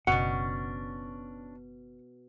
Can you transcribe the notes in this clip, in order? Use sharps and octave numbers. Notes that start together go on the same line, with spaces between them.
F#1 B2 C#4 D4 F#5